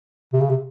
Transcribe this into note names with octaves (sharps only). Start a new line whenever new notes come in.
C3
C#3
C3